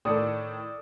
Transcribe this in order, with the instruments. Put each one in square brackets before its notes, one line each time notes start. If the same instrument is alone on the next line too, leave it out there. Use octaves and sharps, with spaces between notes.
[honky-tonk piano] A2 D#3 [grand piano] A4 D5 D#6